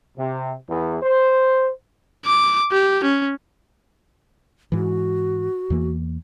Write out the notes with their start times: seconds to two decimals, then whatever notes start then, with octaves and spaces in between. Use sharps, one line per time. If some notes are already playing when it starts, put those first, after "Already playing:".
0.18 C3
0.70 E2
1.02 C5
2.26 D6
2.72 G4
3.04 C#4
4.72 G#2 E3 F#4
5.70 E2 E3 A#3